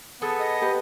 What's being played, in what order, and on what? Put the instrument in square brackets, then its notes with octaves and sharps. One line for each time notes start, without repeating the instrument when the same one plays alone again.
[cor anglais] B3 [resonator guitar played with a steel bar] G#4 A4
[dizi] D#5
[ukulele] G4 B4